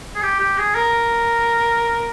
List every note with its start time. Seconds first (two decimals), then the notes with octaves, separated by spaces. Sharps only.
0.15 G#4
0.22 G4
0.40 G4
0.58 G#4
0.75 A#4